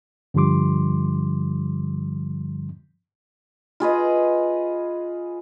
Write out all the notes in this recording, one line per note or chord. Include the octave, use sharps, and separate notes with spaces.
G2 D3 F3 G3 C6 D6
F4 G#4 B4 D#5